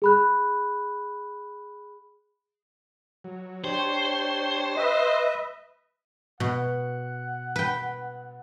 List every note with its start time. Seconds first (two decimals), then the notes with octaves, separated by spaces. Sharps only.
0.02 G#4 B5 F#6
3.24 F#3
3.64 D4 G4 C5 C#5
4.77 B4 D#5 E5
6.40 B2 F#5
7.56 B4 G5